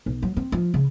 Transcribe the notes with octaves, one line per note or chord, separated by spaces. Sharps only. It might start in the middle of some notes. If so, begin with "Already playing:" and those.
B1
F#3
C4
F3
C#3